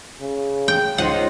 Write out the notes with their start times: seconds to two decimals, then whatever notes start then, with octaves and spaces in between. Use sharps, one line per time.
0.20 C#3
0.68 G5
0.98 C#2 D#4 F4 C5 F#5 F6 D#7